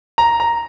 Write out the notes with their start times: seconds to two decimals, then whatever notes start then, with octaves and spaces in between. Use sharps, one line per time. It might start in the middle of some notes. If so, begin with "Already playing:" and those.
0.18 A#5
0.40 A#5